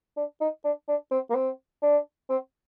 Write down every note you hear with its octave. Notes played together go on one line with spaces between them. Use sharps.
D4
D#4
D4
D4
C4
A#3
C4
D4
C4